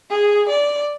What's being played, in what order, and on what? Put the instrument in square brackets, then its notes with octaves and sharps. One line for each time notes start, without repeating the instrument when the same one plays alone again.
[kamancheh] G#4
D5